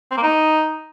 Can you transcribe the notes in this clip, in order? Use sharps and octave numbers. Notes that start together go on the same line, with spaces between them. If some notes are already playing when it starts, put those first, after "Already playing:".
C4
A#3
D#4